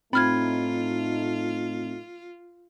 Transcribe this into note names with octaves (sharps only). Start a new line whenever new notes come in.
A2 A3 C4 D#4 F4 B5 F6 G#6